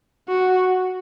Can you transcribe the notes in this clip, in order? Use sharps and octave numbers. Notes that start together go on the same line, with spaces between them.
F#4